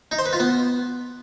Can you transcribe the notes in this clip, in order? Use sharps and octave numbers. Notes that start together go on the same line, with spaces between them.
D#4
C5
B4
F4
B3